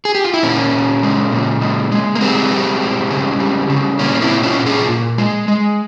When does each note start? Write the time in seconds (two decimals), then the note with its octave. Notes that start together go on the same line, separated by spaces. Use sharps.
0.05 G#4
0.15 G4
0.24 F4
0.34 E4
0.43 A#2 A#3 C#4
0.73 A#2
1.03 G#3
1.32 A#2
1.61 G#3
1.91 G#3
2.15 A#3
2.21 G3 G#3 C4
2.51 G3
2.81 G3
3.10 C#3
3.40 G3
3.69 C#3
3.99 A#2 A#3 C#4
4.21 C4 E4
4.30 A#2
4.43 C#4 F4
4.59 A#2
4.66 F4 G#4
4.88 A#2
5.18 G#3
5.48 G#3